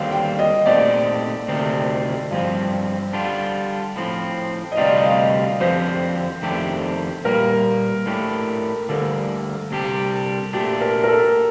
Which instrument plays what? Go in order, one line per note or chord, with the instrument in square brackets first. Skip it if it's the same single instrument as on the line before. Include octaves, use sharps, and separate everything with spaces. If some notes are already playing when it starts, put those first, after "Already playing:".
Already playing: [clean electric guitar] D#2 D3 G3 C4 [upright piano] F5
[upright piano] G5
D#5
[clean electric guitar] A#2 A3 C4 D#4 G4 [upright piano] D5
[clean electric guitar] D2 C3 D#3 A3 C4
[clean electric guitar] G2 F3 C4 [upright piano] F5
[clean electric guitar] D3 G3 D4 F4
A2 F3 C4
[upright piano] D#5
[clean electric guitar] D2 C3 G3 C4 F4 [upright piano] D5
[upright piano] D#5
F5
[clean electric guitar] F2 D3 F3 C4 G4 [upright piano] C5
[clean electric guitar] F2 D#3 A3 D4 G4
[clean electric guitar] A#2 G3 A#3 [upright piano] A#4
[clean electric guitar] A2 A3 D4 G4
[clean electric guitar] D2 D3 G3 A#3 [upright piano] A4
[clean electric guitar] C3 G3 D4 G4
[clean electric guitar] A#2 A3 D4 [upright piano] G4
[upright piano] A#4
A#4
A4